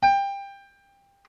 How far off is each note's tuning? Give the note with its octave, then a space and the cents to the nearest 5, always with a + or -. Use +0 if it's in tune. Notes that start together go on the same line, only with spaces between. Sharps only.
G5 +20